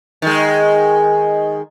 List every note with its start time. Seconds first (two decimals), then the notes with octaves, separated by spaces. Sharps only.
0.22 D#3 G#3